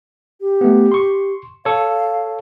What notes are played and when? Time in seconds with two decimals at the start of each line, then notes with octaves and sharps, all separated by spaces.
0.40 G4
0.61 A3 B3
0.92 C6 C#6
1.65 A4 C#5 F5